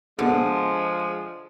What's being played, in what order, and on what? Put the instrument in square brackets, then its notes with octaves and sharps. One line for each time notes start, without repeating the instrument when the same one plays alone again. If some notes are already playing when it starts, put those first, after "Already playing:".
[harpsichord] A#1 B2 [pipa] D3 [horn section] F3 G#3